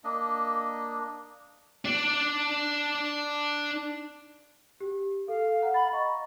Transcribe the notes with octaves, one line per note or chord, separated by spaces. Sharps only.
A#3 D4 D#5
D4 D5
G4
A4 F5
F#5 A#5
B5 A6
D#5 A#5 C#6